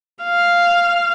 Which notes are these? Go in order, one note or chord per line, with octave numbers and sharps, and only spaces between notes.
F5